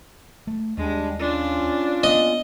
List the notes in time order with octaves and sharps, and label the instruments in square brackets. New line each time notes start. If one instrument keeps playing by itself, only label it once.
[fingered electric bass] A3
[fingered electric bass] D#2 [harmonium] G3 D4 [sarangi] G#3
[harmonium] C#4 F4 [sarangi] D4
[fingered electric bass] A#3 B3 [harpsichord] D#5